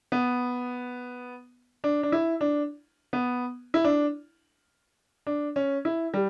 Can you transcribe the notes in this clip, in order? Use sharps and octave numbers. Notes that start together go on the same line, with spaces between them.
B3
D4
D4
E4
D4
B3
E4
D4
D4
C#4
E4
G3